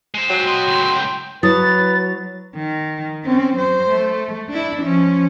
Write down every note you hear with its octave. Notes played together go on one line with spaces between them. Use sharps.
G#3 C5
F#3 G5
F#4 D#5 C6
C#2 A2
F#3 E4 B4 D#6 A6
D#3
C4 C#4
F#3 C5
A3
D4 E4
F3 C#4